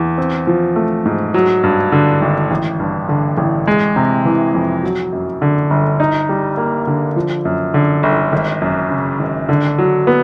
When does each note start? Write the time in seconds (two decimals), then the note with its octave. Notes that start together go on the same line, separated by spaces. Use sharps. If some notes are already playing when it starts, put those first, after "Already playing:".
Already playing: E2
0.18 C4
0.47 F3
0.76 A3
1.06 G#2
1.34 F#3
1.63 G2
1.92 D3
2.21 G#1
2.51 A1
2.80 G2
3.09 D3
3.38 A1
3.67 G#3
3.96 C3
4.25 E3
4.55 F2
4.83 F#3
5.13 F#2
5.42 D3
5.70 G1
6.00 D#4
6.29 G3
6.57 A#3
6.87 D3
7.16 F3
7.45 F#2
7.74 D3
8.03 G1
8.32 G#1
8.62 F#2
8.91 C#3
9.20 G#1
9.49 D3
9.78 F#3
10.07 B3